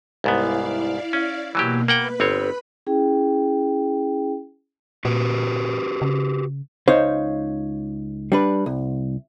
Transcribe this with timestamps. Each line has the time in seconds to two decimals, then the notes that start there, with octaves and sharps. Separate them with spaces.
0.24 C2 G#2 B3 E4 D5 F5
1.13 C#4
1.55 B2 E3 F#3 A#3 G4
1.88 A#3 B4 F#5 G5 B5
2.20 G1 C4 C#5
2.87 C#4 E4 G#4 G5
5.05 A#2 F#4 G4 B4
6.02 C#3
6.88 C#2 D#4 C5 C#5 F5
8.32 G3 D4 B4
8.66 C2